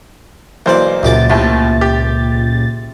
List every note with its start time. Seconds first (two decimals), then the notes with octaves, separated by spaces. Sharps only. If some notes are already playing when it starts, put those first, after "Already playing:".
0.66 B1 E3 A#3 C5 D5
1.03 C#2 F#2 A#2 G4 D6 A6
1.30 D#2 A2 C3
1.81 G4